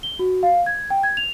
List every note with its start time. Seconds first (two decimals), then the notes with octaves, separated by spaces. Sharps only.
0.03 G7
0.19 F#4
0.43 F5
0.66 G#6
0.90 G5
1.03 G#6
1.17 F7